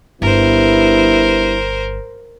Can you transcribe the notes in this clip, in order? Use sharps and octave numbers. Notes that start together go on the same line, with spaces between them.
G1 G2 B3 E4 A#4 C5